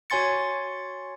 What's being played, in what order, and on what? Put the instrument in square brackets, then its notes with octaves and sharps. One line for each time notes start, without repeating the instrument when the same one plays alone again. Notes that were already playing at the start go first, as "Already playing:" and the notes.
[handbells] F#4 C#5 G#5 C6 A6 C#7